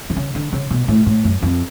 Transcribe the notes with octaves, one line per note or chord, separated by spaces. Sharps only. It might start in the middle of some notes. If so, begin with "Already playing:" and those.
D3
C#3
D3
C#3
B2
A2
A2
F#2
F2